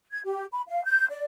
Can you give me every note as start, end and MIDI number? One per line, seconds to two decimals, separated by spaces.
0.11 0.20 92
0.25 0.44 67
0.52 0.62 83
0.68 0.81 77
0.84 1.05 91
1.09 1.24 74